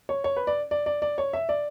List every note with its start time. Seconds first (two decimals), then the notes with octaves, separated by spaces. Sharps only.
0.09 C#5
0.24 C#5
0.37 B4
0.47 D5
0.71 D5
0.86 D5
1.02 D5
1.18 C#5
1.33 E5
1.49 D5